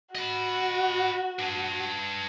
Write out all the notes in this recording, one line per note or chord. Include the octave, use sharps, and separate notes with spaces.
F#4 D#5 B5
D4 B4